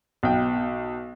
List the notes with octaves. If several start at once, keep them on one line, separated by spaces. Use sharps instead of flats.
B1 G5